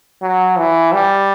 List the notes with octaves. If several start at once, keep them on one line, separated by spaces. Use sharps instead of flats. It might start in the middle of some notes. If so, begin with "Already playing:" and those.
F#3
E3
G3